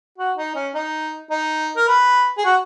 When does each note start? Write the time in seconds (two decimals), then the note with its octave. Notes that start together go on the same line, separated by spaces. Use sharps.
0.18 F#4
0.37 D#4
0.55 C#4
0.74 D#4
1.31 D#4
1.76 A#4
1.88 B4
2.38 G#4
2.45 F#4